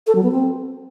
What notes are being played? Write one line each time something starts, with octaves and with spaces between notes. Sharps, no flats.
A4
F#3
B3
C4